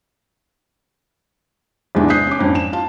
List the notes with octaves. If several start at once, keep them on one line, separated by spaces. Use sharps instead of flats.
E2 G#2 C3 E3 G#3 D4
D#6 F#6 G6 B6 C7
C#4 D6
F2 G#2 C#4 D4
E7
F4 F5 A5